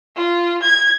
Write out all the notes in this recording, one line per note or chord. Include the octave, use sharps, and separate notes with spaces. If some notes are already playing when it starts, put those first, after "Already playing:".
F4
G#6